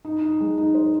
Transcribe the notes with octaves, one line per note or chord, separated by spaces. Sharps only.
D#4
D#4
G#3
D#4
C5